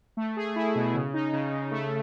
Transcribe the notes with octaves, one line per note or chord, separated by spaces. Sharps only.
A3
G#4
E4
B2
C#3
D#4
C#3
C#3
A3